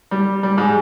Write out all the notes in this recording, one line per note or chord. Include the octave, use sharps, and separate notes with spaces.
G3
G3
G#2